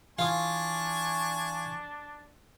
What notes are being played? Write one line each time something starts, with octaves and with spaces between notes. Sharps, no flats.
E3 D4 F4 G#5 C#6 D#6